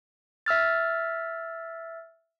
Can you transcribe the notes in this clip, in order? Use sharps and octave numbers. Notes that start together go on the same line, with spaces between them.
E5 E6 F6 A6